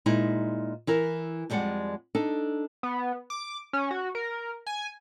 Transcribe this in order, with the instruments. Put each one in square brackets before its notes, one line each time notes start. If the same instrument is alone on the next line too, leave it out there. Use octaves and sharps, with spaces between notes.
[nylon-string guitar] A#2 G#3 D#4 E4
E3 E4 A#4
F2 G3 G#3 D5 F#5
D4 D#4 A4
[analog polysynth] B3
D6
C#4
F#4
A#4
G#5